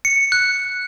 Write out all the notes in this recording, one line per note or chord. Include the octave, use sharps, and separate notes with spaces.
C#7
F#6